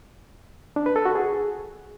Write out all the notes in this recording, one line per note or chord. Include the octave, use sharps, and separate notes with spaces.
D4
B4
A4
F#4
G#4